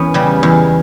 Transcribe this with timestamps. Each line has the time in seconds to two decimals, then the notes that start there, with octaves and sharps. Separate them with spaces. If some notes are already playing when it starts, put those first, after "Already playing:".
Already playing: E2 B3 C#4
0.14 C#3 G3
0.43 E2